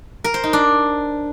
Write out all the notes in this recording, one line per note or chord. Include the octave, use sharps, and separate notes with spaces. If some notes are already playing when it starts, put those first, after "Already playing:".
A#4
C5
D#4
D4